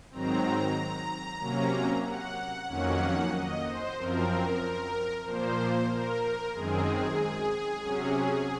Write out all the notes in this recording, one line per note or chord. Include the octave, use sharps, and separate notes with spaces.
G#2 D#3 F#3 C4 A#5
C3 F#3 A#3 C#4
F#5
F2 D#3 F#3 A#3 C#4 F#5
D#5
C5
F#2 F3 C4 A#4
A#2 F3 A#3 C5
A#4
F#2 D#3 G#3 C4 G#4
C3 F#3 C#4